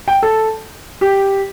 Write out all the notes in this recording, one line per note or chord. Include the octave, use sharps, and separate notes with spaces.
G5
A4
G4